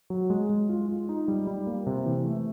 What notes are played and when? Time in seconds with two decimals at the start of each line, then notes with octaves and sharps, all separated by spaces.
0.10 F#3
0.30 G#3
0.50 G#3
0.69 F4
0.89 F4
1.09 D#4
1.28 G3
1.47 G3
1.67 A#3
1.86 C3
2.06 E3
2.26 A3